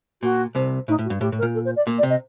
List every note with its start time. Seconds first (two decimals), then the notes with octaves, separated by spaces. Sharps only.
0.22 A#2 F#4
0.55 C2 C3
0.88 A2 D#4
0.99 A2
1.04 F#4
1.10 G2
1.21 A2 G4
1.32 A2
1.38 A#4
1.42 A#2
1.54 A4
1.65 C5
1.76 D5
1.87 A#2
1.98 D5
2.03 C3
2.09 D#5